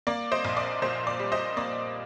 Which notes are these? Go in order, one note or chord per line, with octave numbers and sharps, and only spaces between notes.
A#3 D5
C5 D#5
A#1
D5
A#2 C5
D5
G3
C5 D#5
A#3 D5